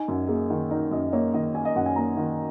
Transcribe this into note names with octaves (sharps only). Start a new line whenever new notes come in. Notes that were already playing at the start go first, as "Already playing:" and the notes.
Already playing: D#4 G#5
F#2
A#3 G#4
D#3
D#4 A#4
F#2 D#5
A#3 C#5
D#3 D#5
D#4 G#5
D#5
F#2 F#5
G#5
A#3 A#5
D#3